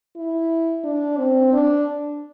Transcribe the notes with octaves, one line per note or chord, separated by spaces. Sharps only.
E4
D4
C4
D4